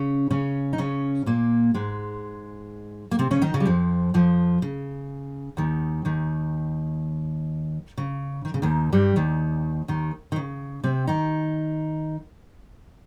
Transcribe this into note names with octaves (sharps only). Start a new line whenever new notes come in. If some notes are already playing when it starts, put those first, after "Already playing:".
Already playing: C#3 C#4
C#3 C#4
D#4
C#3 C#4
A#2 A#3
G#2 G#3
A#3
C3 C4
C#3 C#4
D#3 D#4
C#3 C#4
G3
F2 F3
F2 F3
C#3
D#2 D#3
D#2 D#3
C#3
D#3
C#3
D#2 D#3
G2 G3
D#2 D#3
D#2 D#3
D#3
C#3
C3 C4
D#3 D#4